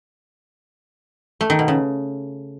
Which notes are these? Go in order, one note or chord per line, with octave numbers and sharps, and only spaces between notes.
A3
D#3
B2
C#3